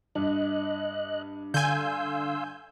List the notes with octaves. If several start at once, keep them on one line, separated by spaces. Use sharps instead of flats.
G2 D#5 F#6
D3 F5 G#5 C6 E6 G6